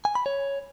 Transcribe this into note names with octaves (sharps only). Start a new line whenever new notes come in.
G#5
B5
C#5